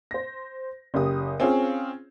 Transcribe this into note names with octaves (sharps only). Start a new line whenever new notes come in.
C5 A#6
F#1 G4 D#6
C4 C#4 F4 G#4